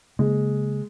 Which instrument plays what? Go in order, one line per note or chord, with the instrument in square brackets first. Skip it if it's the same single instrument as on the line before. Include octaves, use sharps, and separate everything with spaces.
[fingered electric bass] C#3 A#3 [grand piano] G#3